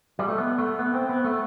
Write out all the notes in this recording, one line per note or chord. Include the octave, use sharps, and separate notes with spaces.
G3
A3
B3
A3
B3
C4
B3
A3